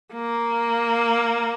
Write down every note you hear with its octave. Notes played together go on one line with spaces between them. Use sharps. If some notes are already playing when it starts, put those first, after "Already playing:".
A#3